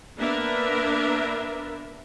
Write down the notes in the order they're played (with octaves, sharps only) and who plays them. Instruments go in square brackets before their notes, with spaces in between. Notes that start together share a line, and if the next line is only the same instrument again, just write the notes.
[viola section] A#3 B3 D4 A#4 B4 E5